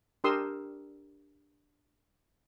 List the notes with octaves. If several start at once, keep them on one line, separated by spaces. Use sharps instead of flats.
D4 G4 A#4 C6 D#6 E6